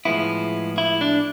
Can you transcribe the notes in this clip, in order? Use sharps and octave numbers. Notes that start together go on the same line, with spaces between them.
A2 F3 G#3 B3 E4
E4
D4